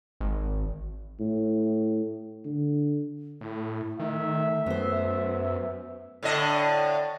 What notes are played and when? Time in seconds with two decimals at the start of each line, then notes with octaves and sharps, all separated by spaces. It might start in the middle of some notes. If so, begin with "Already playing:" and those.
0.21 G#1
1.20 A2
2.45 D3
3.41 A2 E4
3.99 D#3 A3 E5
4.66 F#2 B3 C5
6.23 A2 D3 D#5